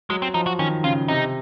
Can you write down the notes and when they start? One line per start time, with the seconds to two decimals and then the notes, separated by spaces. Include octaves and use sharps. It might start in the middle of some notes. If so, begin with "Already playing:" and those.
0.10 F#3 G#3
0.22 C4
0.34 F3 D#4
0.46 F#4
0.59 D#3 C#4
0.84 C#3 F4
1.08 C3 D#4